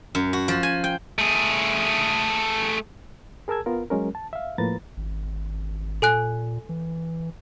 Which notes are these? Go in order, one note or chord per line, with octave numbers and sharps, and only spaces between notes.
F#2
F#4
F3
G#5
G5
A3 G#4
G#4 A#4 A5 E6 G#6
B3 F4 A#4
F#3 G#3 C#4 A#4
A5
E5 F5
A2 F3 A#3 B4 A#5 A6
G#1
A#2 A4 G#5 F#6
E3